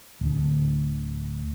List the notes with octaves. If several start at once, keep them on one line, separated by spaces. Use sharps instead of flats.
D1 D2